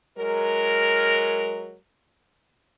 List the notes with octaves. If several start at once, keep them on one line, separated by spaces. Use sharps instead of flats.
F#3 G#3 A#4